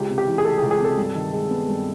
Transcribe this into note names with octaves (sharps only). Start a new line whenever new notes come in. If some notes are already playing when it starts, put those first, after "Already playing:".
Already playing: C#2 G4
C3
G4
E3
G#4
A3 A4
G#4
C#2
G#4
C3 A4
G2
D#3
G#3
B3
G2